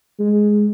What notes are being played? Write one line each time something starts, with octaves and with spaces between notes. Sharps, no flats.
G#3